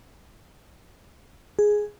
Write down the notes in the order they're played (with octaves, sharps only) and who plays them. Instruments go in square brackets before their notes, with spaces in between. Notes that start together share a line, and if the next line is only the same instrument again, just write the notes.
[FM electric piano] G#4